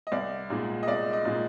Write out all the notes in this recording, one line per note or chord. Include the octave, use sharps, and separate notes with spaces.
D#5
C2 D5
A#2 G#3
D#5
C2 D5
D#5
A#2 G#3